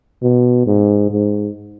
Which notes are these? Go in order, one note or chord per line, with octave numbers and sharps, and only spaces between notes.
B2
G#2
G#2